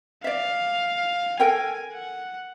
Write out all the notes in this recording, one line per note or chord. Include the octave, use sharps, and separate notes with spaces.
D5 E5 F5
A4 A#4 G5 G#5
F#5